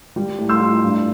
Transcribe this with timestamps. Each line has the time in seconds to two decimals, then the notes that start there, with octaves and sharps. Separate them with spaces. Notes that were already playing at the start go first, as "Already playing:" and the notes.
0.16 G3
0.38 A2
0.49 C6 E6
0.61 A2
0.83 G2